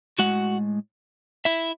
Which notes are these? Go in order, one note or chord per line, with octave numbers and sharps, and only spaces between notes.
A2 G#3 F#4 F#5
E4 E5